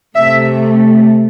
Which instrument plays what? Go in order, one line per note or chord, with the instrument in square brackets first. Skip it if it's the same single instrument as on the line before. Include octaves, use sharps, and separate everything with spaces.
[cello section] C3 A3 E5